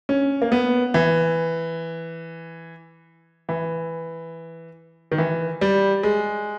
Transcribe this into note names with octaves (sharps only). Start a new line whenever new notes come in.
C#4
A#3
B3
E3
E3
D#3
E3
G3
G#3